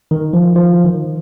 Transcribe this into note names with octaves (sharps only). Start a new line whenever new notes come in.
D#3
F3
F3
D#3